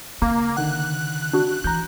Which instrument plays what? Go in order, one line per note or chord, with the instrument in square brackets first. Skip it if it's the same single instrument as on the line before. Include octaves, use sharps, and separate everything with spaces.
[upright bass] C#3 [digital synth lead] A#3
[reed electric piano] D3 D#3 F#5 [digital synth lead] F#6
[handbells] D4 F#4
[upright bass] E3 [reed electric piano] A#5 G6